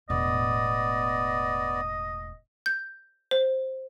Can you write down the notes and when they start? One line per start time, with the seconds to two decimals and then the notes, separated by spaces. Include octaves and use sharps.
0.10 E1 A2 B3 D5 D#5
2.66 G6
3.31 C5